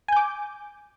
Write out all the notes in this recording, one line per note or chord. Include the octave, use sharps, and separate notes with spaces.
G#5 D6 G6